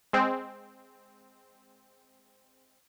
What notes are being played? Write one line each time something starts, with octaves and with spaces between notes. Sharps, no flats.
G#3 C4